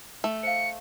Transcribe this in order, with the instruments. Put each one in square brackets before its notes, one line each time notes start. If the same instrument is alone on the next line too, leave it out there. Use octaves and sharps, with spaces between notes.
[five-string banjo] A3
[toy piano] C5 F5 [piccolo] C#7